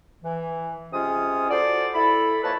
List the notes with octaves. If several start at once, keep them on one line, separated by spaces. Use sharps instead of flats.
E3
C3 G#3 C#4 F4 D#6
F#4 A4 C5 D5
E4 A4 B5
F2 A#3 B4 C#5 D#5 A5